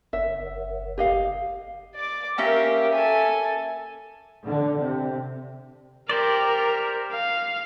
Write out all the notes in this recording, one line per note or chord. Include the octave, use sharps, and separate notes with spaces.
F#1 E5
G4 D#5 F5
D5 D6
A#3 C#4 G4 A#4 E5
A4 G#5
D3
C3
G4 A#4 C5 D5
F5